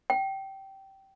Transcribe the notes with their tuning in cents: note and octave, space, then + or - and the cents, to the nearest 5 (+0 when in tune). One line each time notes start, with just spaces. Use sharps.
G5 -15